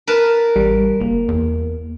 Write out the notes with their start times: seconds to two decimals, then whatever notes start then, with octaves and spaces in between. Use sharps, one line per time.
0.07 A#4 B4 A5
0.56 A1 G3
1.00 F#1 A#3
1.28 E2